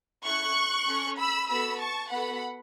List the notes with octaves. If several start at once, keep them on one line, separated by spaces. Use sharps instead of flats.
C#4 E4 A4 C#6 F#6
C#4 A4
B5 E6
B3 F#4 A4 B5 E6
A5 C#6
B3 F#4 A4 F#5 B5